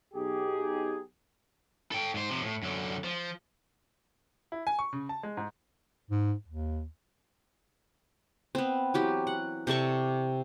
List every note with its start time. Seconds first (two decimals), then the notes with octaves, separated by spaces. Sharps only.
0.14 B1 D#4 G4 G#4
1.92 A4 G5
2.14 G#2 C5
2.30 C3 F3
2.43 A2
2.63 F#2 D3
3.04 F3
4.52 E4
4.67 G#5
4.79 C#6
4.93 C#3
5.09 A5
5.23 G#3
5.37 G#2
6.11 G#2
6.48 D#2
8.55 B3 C4
8.94 E3 F#3 G4
9.27 F#5
9.67 C3 A4 D5 C#6